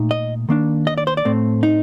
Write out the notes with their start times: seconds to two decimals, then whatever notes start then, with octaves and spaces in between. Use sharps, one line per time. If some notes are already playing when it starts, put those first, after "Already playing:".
Already playing: A#2 A3 D#4
0.11 D#5
0.49 D#3 A#3 D4
0.87 D#5
0.98 D5
1.07 C5
1.17 D5
1.25 A2 A3 C4
1.63 D#4